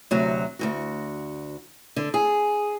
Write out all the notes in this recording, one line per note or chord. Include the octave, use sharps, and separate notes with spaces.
D2 C3 F#3 F#4
D2 G2 F#4
D3
G#4